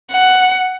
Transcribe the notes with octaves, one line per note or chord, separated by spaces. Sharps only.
F#5